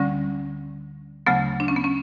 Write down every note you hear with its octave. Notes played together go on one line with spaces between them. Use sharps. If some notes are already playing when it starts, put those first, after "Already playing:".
Already playing: D2 D3 G3 C#4
D2 C#3 F#3 A3 B3
D4
C#4
B3
C#4